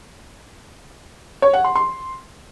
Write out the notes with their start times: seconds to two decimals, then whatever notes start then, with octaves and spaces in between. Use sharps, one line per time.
1.42 C#5
1.53 F#5
1.64 C6
1.75 C6